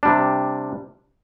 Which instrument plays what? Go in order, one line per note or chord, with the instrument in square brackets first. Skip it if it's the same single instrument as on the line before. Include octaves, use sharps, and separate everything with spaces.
[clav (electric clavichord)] C3 G3 D4